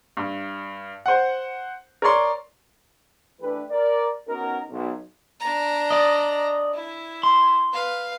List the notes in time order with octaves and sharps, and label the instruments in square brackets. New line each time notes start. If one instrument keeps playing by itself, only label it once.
[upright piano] G2
C5 F#5
A#4 C#5 D5 C6
[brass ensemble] E3 A3 D4 G4 B4
A#4 D5
B3 C#4 D#4 F#4 A#4
B1
[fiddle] D4 A#5
[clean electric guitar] D5 D#5
[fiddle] E4
[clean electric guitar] C6
[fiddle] B4 F5